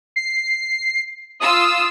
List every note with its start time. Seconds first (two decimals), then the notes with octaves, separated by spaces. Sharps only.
0.16 C7
1.40 F4 D#6 E6